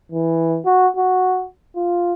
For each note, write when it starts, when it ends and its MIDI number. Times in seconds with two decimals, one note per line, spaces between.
0.12 0.59 52
0.65 0.88 66
0.97 1.46 66
1.76 2.13 65